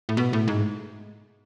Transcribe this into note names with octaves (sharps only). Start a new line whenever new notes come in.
A2
B2
A2
G#2